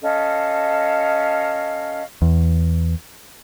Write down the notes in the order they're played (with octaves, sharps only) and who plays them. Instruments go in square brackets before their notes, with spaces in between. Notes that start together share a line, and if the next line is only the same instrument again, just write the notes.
[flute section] C#4 A4 D#5 F5
[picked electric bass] E2